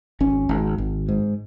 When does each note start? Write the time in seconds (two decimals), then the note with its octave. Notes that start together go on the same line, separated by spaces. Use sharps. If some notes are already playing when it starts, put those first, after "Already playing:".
0.20 G#1 C#4
0.49 G#1
0.78 G#1
1.09 G#2